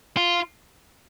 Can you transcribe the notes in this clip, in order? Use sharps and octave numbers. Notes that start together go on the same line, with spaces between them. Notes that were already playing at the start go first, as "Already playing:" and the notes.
F4